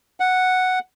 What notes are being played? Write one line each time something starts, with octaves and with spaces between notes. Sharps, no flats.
F#5